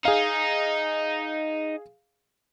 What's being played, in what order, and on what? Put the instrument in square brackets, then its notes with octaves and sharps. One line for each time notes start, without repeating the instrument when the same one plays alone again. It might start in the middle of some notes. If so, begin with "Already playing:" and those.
[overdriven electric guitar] D#4 [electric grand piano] G#4 F5